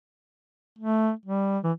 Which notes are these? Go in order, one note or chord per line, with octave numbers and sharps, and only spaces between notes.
A3
G3
E3